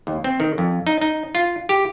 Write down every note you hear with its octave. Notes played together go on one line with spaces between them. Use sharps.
D#2
C4
D#3
F2
D#4
D#4
F4
G4